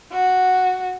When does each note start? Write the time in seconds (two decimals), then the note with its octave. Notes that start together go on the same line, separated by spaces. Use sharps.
0.12 F#4